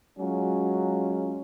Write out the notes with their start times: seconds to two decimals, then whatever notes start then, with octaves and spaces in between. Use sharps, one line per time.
0.19 F#3 G#3 C#4 F4